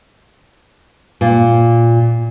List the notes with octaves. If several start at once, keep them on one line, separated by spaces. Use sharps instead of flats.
A#2